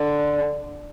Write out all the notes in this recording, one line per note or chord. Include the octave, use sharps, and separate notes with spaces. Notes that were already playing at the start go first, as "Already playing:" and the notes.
Already playing: D3